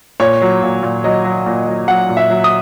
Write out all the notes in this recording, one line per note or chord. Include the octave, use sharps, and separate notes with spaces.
A#2 C#5
F#3
A#2
A#2
F#3 D#5
F#3
A#2
F#3
F#3 F#5
A#2
E5
F#3
D#6